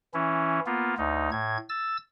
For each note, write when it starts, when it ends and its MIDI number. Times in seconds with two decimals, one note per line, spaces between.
0.14 0.60 52
0.14 0.60 61
0.14 0.60 64
0.66 0.95 58
0.66 0.95 59
0.66 0.95 65
0.98 1.30 38
0.98 1.30 63
1.32 1.57 45
1.32 1.57 92
1.69 1.97 88
1.69 1.97 93